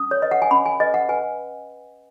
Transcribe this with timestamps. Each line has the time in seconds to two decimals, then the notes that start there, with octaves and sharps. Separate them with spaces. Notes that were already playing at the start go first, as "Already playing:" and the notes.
Already playing: C#4 D#6
0.11 C#5
0.22 B4 D#5
0.31 F#5
0.42 G#5
0.51 C#4 B5
0.66 G#5
0.80 B4 D#5
0.94 F#5
1.09 B4 G#5